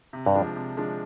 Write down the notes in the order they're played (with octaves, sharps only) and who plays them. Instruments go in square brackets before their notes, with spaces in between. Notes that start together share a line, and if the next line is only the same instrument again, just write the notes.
[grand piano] C3
[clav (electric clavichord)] G2
[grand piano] F3 G#3 D4
C3
F3 G#3 D4